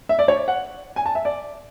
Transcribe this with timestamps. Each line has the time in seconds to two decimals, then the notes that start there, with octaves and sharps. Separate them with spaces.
0.09 E5
0.19 D5
0.28 C#5
0.48 F#5
0.96 G#5
1.06 A5
1.15 E5
1.25 D5